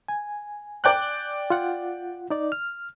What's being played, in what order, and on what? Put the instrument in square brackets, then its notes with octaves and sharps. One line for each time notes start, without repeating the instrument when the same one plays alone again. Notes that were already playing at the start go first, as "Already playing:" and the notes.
[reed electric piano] G#5
[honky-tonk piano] D5 G5 F#6
[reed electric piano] F4 F#5
D#4 D5
F6